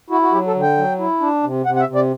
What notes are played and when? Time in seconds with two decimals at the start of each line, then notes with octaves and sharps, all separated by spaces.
0.10 E4 F#4
0.22 F#4
0.32 F#3 G4
0.47 A4
0.55 D3
0.62 G5
0.77 F#3
0.99 E4
1.21 D4
1.43 C3
1.65 C3 F#5
1.76 F#5
1.80 E5
1.88 C3
1.95 D5